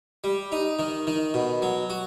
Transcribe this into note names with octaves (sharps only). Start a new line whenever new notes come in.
G3
D#4
D#3
D#3
B2
F#3
F#4